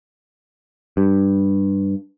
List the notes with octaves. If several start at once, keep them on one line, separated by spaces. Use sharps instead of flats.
G2